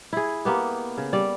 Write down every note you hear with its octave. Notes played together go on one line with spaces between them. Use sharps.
E4 G#4
A#3 B3 G4
C#3
G3 D5